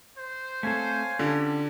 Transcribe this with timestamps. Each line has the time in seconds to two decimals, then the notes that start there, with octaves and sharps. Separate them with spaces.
0.18 C5
0.63 A3 C4 A4 C#5 F5 G#5
1.19 D3 C#4 F4 G4